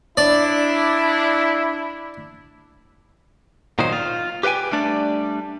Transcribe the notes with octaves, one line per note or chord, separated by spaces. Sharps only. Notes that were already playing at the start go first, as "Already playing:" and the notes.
D4 E4 D5
A#2 D#3 F#3 D#4 C5
F4
G4 B4 E5 G5 G#5
G3 A3 D4 D5